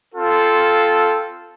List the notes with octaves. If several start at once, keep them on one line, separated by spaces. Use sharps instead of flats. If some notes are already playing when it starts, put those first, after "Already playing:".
C4 F4 A4